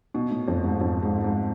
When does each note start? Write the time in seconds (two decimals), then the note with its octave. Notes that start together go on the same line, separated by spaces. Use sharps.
0.14 B2
0.31 A2
0.48 F2
0.64 G#2
0.81 F2
1.02 G#2
1.24 G#2